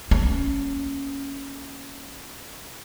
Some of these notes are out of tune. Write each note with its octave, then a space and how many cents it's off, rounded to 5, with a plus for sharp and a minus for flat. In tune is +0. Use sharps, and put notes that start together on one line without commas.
A#3 +0 C#4 +0